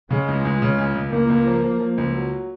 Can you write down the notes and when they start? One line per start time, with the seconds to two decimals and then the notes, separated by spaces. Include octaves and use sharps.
0.11 C#3 G#3
0.28 C#2
0.45 C#2
0.62 C#3
0.78 C#2
0.95 C#2
1.12 C#2 A#3
1.30 C#2
1.46 F3
1.64 F3
1.80 F3
1.98 C#2
2.14 F#3